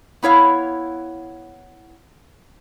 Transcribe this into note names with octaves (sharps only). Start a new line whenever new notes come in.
B3 E4 C#5 F5